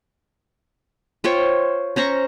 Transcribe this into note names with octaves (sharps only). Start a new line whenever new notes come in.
F4 C5 C#5 G5
C#4 C5 A#5 C#6